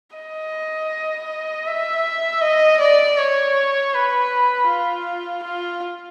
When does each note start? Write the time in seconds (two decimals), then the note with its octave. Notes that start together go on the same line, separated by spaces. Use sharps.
0.16 D#5
1.67 E5
2.42 D#5
2.80 D5
3.18 C#5
3.93 B4
4.68 F4
5.43 F4